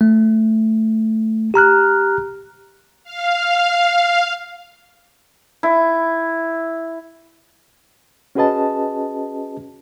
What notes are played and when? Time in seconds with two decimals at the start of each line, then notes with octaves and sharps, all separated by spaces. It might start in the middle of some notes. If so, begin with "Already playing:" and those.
0.01 A3
1.54 G4 A#5 F6 F#6
3.04 F5
5.63 E4
8.35 C#4 F#4 G#4 B4 D#5 A5